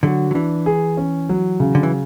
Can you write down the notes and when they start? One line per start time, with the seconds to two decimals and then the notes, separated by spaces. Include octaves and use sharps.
0.03 D3 F#3 F#4
0.31 F#3
0.34 E3 D4
0.66 G#4
0.97 C#4
1.29 F#3
1.60 C#3
1.75 D3
1.83 E3